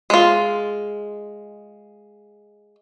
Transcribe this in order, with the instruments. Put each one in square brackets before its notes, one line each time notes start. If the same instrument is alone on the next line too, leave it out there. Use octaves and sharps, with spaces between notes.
[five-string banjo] G#3 F4